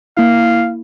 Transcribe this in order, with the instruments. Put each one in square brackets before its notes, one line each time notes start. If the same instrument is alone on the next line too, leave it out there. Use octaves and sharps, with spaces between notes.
[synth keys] A#3 E4 [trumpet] F5